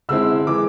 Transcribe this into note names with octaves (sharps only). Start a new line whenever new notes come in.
D3 G#3 C4 E4 E6
E3 G#3 D6